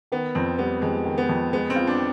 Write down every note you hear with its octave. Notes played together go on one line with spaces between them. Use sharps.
D#3 B3
F2 C4
G3 B3
F2 G#3
D#3
B3
F2
G#3 B3
C4
F4
D4